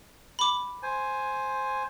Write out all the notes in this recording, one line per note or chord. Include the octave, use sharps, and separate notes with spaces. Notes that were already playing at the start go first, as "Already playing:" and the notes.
B5 D6
C5 G#5